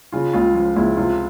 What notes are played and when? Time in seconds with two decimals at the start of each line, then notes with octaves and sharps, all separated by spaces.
0.12 C#3 F4
0.33 C#2 F4
0.54 F3 F4
0.76 C#2 E4
0.97 C3 F4